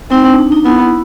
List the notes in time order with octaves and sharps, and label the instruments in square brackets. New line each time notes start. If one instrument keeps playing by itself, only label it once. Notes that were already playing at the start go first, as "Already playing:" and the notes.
[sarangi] C4 [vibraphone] D#4
[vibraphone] D4
D4
D#4
[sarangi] B3 [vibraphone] E4